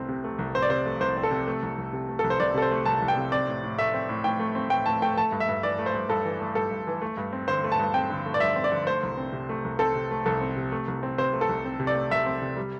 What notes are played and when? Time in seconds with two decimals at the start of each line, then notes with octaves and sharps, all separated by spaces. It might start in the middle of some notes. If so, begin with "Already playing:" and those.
Already playing: C2 A3 C4
0.09 C3
0.24 A3
0.39 C2
0.55 C4 C5
0.62 D5
0.70 C3 C5
0.86 A3
1.00 C2 C5
1.17 C4
1.23 A4
1.31 C3
1.47 A3
1.63 C2
1.78 C2
1.93 C3
2.09 A3
2.19 C2 A4
2.30 C5
2.40 C2 D5
2.54 C3 A4
2.62 C5
2.71 A3
2.86 C2 A5
3.02 C2
3.08 G5
3.17 C3
3.32 C4 D5
3.48 A2
3.63 A2
3.79 A3 E5
3.94 C4
4.09 A2
4.24 A2 G5
4.39 A3
4.55 C4
4.70 A2 G5
4.86 A2 A5
5.02 A3 G5
5.17 A3 A5
5.32 G2
5.40 E5
5.49 G2
5.63 E3 D5
5.78 A3
5.86 C5
5.94 G2
6.09 G2 A4
6.25 E3
6.40 A3
6.55 G2 A4
6.71 G2
6.87 E3
7.01 A3
7.17 G2
7.33 C4
7.48 D3 C5
7.64 A3
7.72 A5
7.79 G2
7.94 C4 G5
8.10 D3
8.26 A3
8.34 D5
8.40 G2 E5
8.56 C4
8.64 D5
8.72 D3
8.87 A3 C5
9.03 C2
9.18 C4
9.33 C3
9.49 A3
9.64 C2
9.79 C4 A4
9.95 C3
10.11 A3
10.26 C2 A4
10.41 C4
10.57 C3
10.72 A3
10.88 C2
11.03 C4
11.18 C3 C5
11.33 A3
11.41 A4
11.49 C2
11.65 C4
11.80 C3
11.87 D5
11.95 A3
12.11 C2 E5
12.26 C4
12.42 C3
12.57 G3